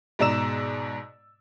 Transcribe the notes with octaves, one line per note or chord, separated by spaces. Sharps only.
G#2 B2 D5 A#5 E6 E7